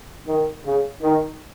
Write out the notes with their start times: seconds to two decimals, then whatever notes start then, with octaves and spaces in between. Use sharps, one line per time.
0.28 D#3
0.65 C#3
1.02 D#3